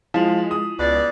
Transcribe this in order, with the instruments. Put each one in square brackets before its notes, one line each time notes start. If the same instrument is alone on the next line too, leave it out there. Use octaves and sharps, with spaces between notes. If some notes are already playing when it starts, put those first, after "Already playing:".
[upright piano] F3 [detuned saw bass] G#3 [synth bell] E4 F4 F#7
[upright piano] D#6
[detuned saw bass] C#2 [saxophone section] B2 D5